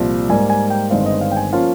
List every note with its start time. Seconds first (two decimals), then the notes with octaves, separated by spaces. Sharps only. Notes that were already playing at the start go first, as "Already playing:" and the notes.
Already playing: C2 A#2 F3
0.29 G#2 G3 A#3 G#5
0.50 G#5
0.70 G5
0.90 G1 G2 D#3 G#3 C4 F5
1.06 D#5
1.21 F5
1.31 G5
1.37 G#5
1.53 F3 A#3 C#4 F4 F5